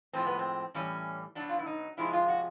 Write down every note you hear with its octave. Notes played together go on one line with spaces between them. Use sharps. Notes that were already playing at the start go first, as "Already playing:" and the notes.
A2 F3 G#3 C4
B3
C4
A2 E3 G3 C#4
B2 F#3 D4
F4
E4
D#4
C3 F3 G#3 E4
F4
F#4